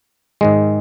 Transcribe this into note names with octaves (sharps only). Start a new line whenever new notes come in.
G#2 D#3 G#3